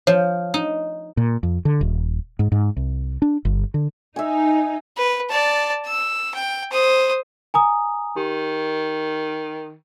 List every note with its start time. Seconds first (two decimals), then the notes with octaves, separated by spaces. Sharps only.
0.07 F3 C#5
0.54 D#4
1.17 A#2
1.43 F2
1.65 D3
1.81 D#1
2.39 G#2
2.52 G#2
2.76 C2
3.22 D4
3.45 G1
3.74 D3
4.16 D#4 E5 G#5
4.98 B4
5.30 D5 A5
5.86 E6
6.35 G5
6.72 C5 D#6
7.54 G#5 A#5 D#6
8.16 D#3 G4